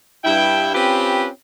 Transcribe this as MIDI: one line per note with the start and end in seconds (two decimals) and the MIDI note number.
0.24 0.73 43
0.24 0.73 64
0.24 0.73 79
0.75 1.27 60
0.75 1.27 61
0.75 1.27 65
0.75 1.27 67
0.75 1.27 71